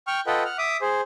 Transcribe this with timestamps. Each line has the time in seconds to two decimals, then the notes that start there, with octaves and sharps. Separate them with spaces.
0.07 G5 C#6 F6
0.27 F4 A4 B4 D#5 F#5 G5
0.45 F#5 F6
0.58 E5 D6 D#6
0.82 G#4 C5